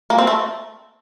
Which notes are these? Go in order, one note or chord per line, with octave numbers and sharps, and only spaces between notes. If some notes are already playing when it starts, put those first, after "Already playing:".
A#3
C4
A3